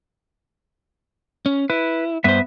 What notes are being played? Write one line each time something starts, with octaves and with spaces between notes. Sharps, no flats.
C#4
E4 B4
G2 B3 B4 C5 E5